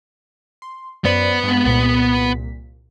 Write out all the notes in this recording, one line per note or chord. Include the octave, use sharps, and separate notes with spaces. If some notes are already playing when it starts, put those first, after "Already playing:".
C6
F#2 B3 B4 C5 D5
G2 G#3
C2 A#2 B6